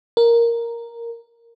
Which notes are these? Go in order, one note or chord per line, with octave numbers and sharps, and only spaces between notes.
A#4